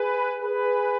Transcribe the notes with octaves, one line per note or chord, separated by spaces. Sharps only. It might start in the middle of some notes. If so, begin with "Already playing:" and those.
Already playing: G#4 B4
G#4 B4